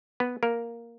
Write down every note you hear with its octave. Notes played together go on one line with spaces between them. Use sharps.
B3 B4
A#3 A#4